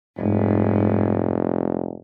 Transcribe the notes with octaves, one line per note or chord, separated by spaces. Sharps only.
F1 G#2